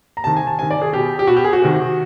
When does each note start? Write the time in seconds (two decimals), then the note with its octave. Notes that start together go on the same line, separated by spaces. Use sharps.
0.17 A#5
0.24 C3 D#3 A5
0.36 G#5
0.47 A5
0.59 C3 G#5
0.62 D#3
0.71 D5
0.81 G#4
0.93 B2 G4
1.19 G4
1.27 B2 F#4
1.37 G4
1.44 G#4
1.53 F#4
1.62 C3 D#3